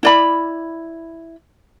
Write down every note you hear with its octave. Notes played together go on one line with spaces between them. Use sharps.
E4 D5 B5